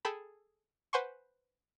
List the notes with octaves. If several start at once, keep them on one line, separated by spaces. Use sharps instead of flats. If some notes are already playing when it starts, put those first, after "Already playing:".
G#4 A4 G5 A5 B5
B4 C5 F#5 G#5 C6 C#6